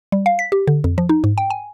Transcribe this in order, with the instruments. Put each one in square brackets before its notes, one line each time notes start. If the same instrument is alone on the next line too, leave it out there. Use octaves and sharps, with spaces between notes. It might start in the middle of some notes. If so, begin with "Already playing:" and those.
[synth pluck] G3
F5
B6
G4
D3
F2
F3
D#4
G#2
G5
G#5